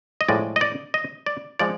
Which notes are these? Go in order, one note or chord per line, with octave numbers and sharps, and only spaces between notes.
D#5
A2 F3 G#3 D5
D#5
D5
D#5
D5
F3 G#3 D5